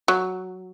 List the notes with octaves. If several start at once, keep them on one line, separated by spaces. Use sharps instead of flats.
F#3